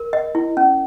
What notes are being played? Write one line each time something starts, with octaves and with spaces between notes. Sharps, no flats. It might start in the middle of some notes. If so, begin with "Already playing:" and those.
Already playing: A#4
D#5
E4
C#4